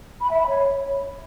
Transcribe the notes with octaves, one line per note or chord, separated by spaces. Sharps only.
B5
E5
B5
C#5